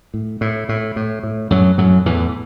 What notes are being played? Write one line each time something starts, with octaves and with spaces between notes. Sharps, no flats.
A2
A2
A2
A2
A2
F#2 A2 F#3
F#2 A2 F#3
E2 A2 E3